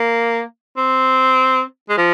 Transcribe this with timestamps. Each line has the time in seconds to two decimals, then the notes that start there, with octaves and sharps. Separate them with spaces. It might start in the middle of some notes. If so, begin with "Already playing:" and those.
Already playing: A#3
0.77 C4
1.89 G#3
1.98 F3